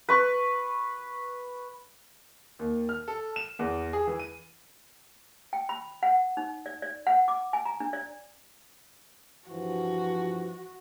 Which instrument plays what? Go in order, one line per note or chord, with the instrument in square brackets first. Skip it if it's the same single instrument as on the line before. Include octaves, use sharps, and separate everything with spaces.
[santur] B4 C#6
[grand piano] D#2
F6
A4
E7
E2
G#4
E3
D#7
[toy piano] G5
B5
F#5
D#4
D5
D5
F#5
D6
G#5
A#5
D4
D5
[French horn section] G2 E3 F3 [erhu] F#4